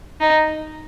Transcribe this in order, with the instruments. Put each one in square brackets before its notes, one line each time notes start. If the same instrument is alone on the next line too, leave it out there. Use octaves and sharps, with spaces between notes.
[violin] D#4